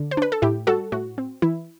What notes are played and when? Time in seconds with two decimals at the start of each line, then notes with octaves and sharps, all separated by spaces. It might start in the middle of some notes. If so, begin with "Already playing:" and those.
Already playing: D3
0.11 C5
0.17 D4 B4
0.32 A4
0.42 A2 E4 G4
0.67 G3 F#4 A4
0.92 A2 F#4
1.18 C4
1.42 E3 E4